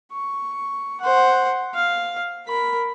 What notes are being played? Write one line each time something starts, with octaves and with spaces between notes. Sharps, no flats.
C#6
C5 F#5
F5
A#4 B5